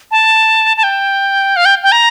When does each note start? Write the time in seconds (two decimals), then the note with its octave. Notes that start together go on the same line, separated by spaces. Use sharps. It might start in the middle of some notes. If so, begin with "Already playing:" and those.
0.11 A5
0.77 A5
0.83 G5
1.56 F5
1.65 G5
1.83 G5
1.92 A#5